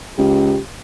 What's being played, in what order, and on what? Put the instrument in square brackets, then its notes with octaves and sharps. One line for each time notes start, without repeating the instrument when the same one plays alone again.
[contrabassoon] C#2 [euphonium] G4